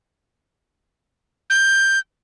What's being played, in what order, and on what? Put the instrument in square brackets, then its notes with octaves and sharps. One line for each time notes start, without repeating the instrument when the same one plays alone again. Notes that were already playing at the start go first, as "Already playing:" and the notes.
[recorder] G6